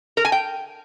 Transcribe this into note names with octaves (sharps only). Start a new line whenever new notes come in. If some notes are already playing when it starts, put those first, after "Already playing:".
A#4
G#5
G5